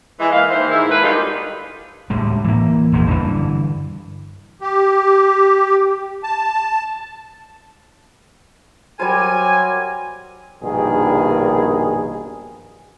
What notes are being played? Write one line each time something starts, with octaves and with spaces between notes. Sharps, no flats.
E3 G#3
A#3 B4 D#5 F5
D#2 E3 C5
G#2 D#3 E4
A#3 G#4 A4 B4
D#3 F#3 G3 D4 D#4 F4
D2 A2 G3 G#3
E3 A#3
E1 A#1 G#2 B2
G2 D3 E3
G4
A5
F#3 G3 A#4 C5 G#5
A#1 G2 B2 D#3 G#4